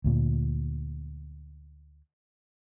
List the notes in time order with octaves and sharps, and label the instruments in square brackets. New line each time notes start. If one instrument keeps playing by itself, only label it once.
[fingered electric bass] D2 A#2